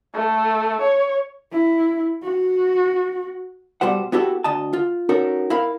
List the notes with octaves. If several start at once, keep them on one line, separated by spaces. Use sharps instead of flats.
A3
C#5
E4
F#4
B2 G3 G4 C5 F#5
B3 E4 F#4 G4 A4
D2 D#5 A5
F4
C#4 D#4 F#4 A4 A#4
E4 A#4 F5 B5